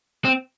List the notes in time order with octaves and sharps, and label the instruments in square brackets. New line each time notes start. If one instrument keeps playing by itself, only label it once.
[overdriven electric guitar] C4